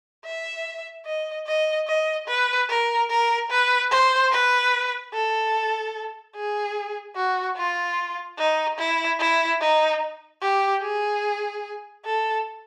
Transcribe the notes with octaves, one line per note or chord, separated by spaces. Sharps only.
E5
D#5
D#5
D#5
B4
A#4
A#4
B4
C5
B4
A4
G#4
F#4
F4
D#4
E4
E4
D#4
G4
G#4
A4